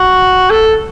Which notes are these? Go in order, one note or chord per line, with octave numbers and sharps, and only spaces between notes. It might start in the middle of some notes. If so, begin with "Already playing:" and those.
Already playing: F#4
A4